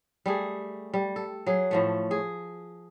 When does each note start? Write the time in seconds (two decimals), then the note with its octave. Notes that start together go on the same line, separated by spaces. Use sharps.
0.26 G3 A3 G#4
0.94 G3
1.16 A4
1.46 F#3 G#4
1.71 A2 F3 A3
2.11 G#4